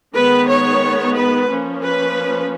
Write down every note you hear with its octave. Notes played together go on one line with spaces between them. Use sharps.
D#3 G#3 B3 B4
C#5
B4
F3 A#3 C#4
B4